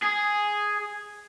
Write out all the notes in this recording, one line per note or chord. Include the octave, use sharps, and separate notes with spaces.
G#4